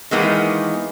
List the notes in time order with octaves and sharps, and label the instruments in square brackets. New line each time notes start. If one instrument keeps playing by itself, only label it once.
[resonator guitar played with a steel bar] D#3 E3 G#3 A#3 B3